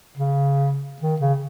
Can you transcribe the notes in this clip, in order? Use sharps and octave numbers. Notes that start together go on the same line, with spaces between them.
C#3
D#3
C#3